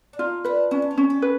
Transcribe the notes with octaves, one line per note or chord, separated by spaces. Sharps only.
D4
D#4 F4
D4 B4
C#4 D4
E4
F4
C#4
G4
B4